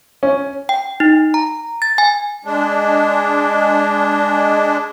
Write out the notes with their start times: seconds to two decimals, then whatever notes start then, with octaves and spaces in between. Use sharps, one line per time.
0.23 C#4
0.69 G5
1.00 D#4
1.34 A#5
1.82 A6
1.98 G#5
2.45 G#3 D4